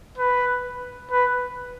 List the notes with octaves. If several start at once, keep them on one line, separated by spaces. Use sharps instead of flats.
B4
B4